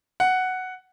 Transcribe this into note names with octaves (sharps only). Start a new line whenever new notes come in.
F#5